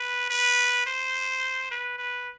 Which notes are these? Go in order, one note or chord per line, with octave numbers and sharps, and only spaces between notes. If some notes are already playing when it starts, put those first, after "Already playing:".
Already playing: B4
B4
C5
B4
B4